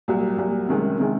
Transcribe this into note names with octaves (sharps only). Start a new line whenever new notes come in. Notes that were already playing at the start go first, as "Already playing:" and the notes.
C2 A#2 F#3
C2 A#2 F#3
C2 C3 D#3 G#3 C#4
C3 D#3 G#3 C#4